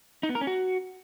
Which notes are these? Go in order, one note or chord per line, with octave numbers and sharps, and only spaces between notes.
D#4
B3
A#4
C#4
F#4